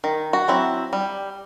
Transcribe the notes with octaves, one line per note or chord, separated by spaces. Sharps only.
D#3
F#4
F#3 C4 E4
G3